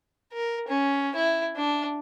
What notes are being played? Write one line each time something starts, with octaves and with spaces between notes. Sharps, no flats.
A#4
C#4
E4
D4